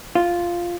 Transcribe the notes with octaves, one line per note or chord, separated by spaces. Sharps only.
F4